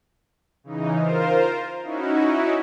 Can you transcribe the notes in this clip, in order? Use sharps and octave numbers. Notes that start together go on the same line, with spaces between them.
C#3 E3 D#4
F4 A#4 C5
C#4 D#4 E4 F#4